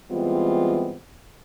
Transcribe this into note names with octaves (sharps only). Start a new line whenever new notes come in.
E3 G3 G#3 B3 C4 F4